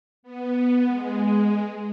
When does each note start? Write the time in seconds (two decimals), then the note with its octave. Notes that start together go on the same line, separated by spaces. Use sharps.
0.23 B3
0.86 G#3
1.49 G#3